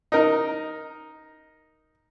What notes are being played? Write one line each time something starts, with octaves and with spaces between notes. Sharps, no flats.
D#4 A#4